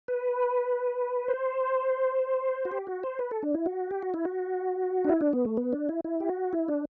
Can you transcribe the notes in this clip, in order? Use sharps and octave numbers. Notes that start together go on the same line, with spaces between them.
B4
C5
F#4
G4
F#4
C5
B4
A4
D4
E4
F#4
G4
F#4
E4
F#4
D4
E4
D4
B3
A3
B3
D4
E4
E4
G4
F#4
E4
D4